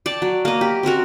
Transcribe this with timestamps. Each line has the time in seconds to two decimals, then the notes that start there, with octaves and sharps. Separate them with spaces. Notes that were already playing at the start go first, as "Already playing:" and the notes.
0.06 D5 G5 A5
0.22 F#3
0.45 A#3 D#5
0.61 G4 B5
0.83 C4 C#4 F#4 A#4